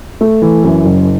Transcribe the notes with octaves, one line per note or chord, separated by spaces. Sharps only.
A3
E3
F#2
F#1